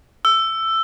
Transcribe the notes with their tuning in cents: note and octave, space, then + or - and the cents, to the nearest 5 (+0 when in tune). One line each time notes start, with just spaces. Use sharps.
E6 +10